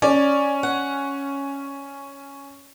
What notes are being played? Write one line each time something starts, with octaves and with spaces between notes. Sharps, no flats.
C#4 D5
F#5